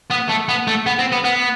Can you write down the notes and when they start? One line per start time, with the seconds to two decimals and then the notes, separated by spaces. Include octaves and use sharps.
0.11 B3
0.29 A3
0.49 B3
0.67 A3
0.86 B3
0.99 C4
1.12 B3
1.24 B3